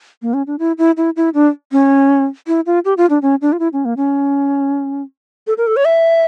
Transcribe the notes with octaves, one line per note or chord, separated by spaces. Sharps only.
A#3
C#4
D4
E4
E4
E4
E4
D4
C#4
E4
F4
G4
F4
D4
C#4
D4
F4
E4
C#4
A#3
C#4
A4
A#4
A4
C#5
E5